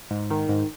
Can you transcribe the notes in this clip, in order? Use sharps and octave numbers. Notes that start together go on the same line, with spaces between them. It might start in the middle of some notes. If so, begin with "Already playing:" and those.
G#2
D#3
G#2